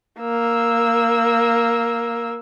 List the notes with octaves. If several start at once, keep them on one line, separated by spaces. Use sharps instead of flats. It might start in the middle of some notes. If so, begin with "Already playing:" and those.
A#3 E6